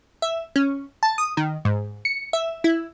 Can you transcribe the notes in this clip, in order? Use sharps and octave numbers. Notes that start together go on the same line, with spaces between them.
E5
C#4
A5
D#6
D#3
G#2
C#7
E5
E4